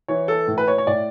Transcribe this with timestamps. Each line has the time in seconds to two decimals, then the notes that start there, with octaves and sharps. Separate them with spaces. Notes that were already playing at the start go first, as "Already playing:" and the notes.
0.08 E3 C#5
0.28 A4
0.48 A2
0.58 B4
0.68 C#5
0.78 C#5
0.87 A2 D5